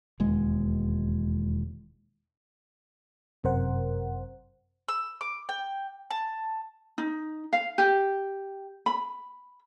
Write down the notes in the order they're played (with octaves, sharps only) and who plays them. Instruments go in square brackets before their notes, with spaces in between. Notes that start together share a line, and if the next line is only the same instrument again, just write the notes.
[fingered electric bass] E1 D#2 G#3
[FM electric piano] G1 F#2 C3 A#4 C5 F#5
[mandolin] E6
D6
G5
A5
[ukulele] D#4
F5
G4
B5